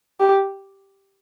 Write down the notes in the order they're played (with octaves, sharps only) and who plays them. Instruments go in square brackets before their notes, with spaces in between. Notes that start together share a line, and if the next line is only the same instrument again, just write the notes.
[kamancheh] G4